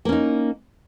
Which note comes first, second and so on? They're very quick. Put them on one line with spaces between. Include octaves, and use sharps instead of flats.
A#3 C#4 D#4